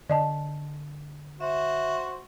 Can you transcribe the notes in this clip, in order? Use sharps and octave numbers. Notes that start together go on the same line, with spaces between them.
D3 D5 D#5 A5
F#4 C5 E5